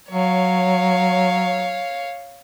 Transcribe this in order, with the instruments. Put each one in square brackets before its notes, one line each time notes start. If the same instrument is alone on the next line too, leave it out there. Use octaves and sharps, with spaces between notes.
[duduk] F#3 [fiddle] C#5 F5